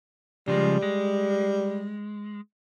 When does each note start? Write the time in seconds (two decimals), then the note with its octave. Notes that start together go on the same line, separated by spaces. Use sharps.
0.48 C#3 F3 G3 G#3
0.82 G#3